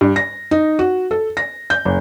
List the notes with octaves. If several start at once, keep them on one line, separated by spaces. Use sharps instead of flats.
G2
A#6
D#4
F#4
A4
A#6
G6
F#1